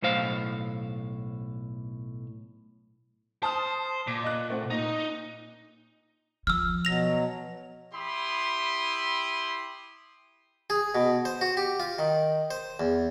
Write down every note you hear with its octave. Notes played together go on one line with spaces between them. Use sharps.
B1 A2 C5 F5
C5 A5 D#6 F6
A#2
D#5 F#6
A3 C4 F#5
A#2 D#4
F3 E6 F6
B2 F#3 A#6 F7
E4 G4 B5 C6 D#6
G#4
B2
C5
F#4
G4
F4
D#3
C5
E2